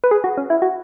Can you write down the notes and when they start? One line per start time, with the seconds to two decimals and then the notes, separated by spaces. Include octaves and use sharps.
0.04 B4
0.11 G#4
0.24 F#4
0.37 C#4
0.50 E4
0.62 F#4